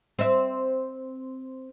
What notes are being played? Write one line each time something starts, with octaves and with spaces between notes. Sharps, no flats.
C4 E5